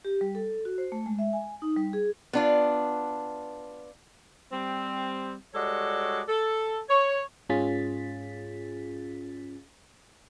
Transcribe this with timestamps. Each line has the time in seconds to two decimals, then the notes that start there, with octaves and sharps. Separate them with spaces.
0.05 G4
0.21 G3
0.35 A4
0.65 F#4
0.78 C5
0.92 A3
1.06 G#3
1.19 E5
1.33 G#5
1.62 D#4
1.77 G3
1.93 G#4
2.33 B3 D4 F4
4.52 G3 C4
5.54 G3 G#3 F#4 A4 C#5 D5
6.29 A4
6.89 C#5
7.49 G#2 C#4 F4 G#4 A6 B6